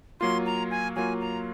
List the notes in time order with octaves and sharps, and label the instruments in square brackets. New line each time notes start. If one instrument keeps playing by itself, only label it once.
[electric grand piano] F#3 A#3 F4 [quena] C6
[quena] A#5
G#5
[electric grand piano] F#3 A#3 F4 [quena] G#5
[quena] A#5